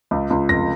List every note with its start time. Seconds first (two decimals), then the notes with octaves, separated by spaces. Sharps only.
0.11 C#2
0.30 C#2
0.49 F1 A#6